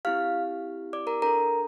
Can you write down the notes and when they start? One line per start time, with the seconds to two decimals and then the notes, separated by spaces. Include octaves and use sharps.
0.05 C4 E4 G4 F5 F6
0.93 D5 D6
1.07 A#4 A#5
1.22 D4 A4 A#4 A#5